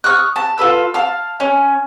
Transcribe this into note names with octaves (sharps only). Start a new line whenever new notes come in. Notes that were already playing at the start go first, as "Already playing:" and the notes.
C#6 D#6 F6 F#6
A5
F4 A4 B4 E6
F5 A5 F6
C#4